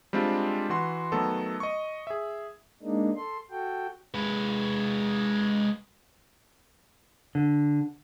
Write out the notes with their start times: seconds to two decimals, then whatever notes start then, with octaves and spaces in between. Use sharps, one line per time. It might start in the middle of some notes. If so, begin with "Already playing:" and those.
0.13 G3 G#3 C4 D4 F4
0.69 E3 F#4 C6
1.12 D#3 F#3 A3 B3 A4
1.60 D#5 C#6
2.07 G#4 E5
2.82 G#3 A#3 D4 D#4
3.16 A4 C6
3.51 F#4 A4 G5
4.15 G#3 B4
7.35 D3